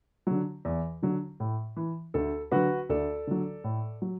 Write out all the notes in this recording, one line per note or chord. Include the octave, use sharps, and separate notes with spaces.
D3 F#3
E2
D3 F#3
A2
E3
D2 A4
D3 F#3 F#4 B4
D2 A4 D5
D3 F#3
A2
F#3